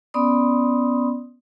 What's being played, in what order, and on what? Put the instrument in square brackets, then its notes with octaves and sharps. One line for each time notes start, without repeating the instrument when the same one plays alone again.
[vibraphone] B3 C#4 D5 B5 C6 D#6